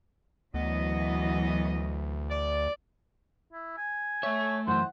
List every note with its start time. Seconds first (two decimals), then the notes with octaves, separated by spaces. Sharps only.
0.54 D2 E3 F#3 B3 D#5
2.29 D5
3.53 E4
3.78 G#5
4.23 A3 C#5 E5
4.68 F#2 E3 C5 F#5